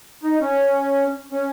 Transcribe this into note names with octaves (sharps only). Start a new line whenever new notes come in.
D#4
C#4
C#4